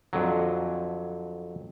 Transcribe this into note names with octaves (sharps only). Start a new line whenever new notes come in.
F2 D3 F#3